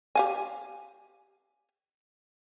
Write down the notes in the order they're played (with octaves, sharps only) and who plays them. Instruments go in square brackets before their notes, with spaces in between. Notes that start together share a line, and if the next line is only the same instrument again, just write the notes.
[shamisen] G4 F5 G#5